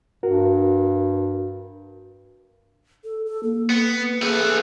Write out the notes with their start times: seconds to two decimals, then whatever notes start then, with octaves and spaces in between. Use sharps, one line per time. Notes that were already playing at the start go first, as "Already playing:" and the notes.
0.23 G2 F#4 A#4
3.04 A4
3.26 A4
3.43 A#3
3.70 B3
3.99 A#3
4.22 A3 G#4 B4